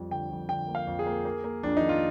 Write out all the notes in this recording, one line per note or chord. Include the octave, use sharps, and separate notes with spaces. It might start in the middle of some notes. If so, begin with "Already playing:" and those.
Already playing: F2 G3
D3 G5
F2
D3 G5
A#3
F5
F2
G#4
A#3
A#3
A#3
F2 D4
D#3 D#4
F4